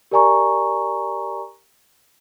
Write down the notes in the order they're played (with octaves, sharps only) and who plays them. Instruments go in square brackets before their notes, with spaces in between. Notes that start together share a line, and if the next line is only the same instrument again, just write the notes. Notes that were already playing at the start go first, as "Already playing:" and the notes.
[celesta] G4 A#4 D5 G#5 A#5 C#6